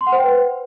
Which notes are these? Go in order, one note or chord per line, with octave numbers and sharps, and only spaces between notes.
C6
F#5
C5
G5
B4